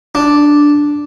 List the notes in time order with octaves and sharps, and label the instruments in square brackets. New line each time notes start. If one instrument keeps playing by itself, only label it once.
[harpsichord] D4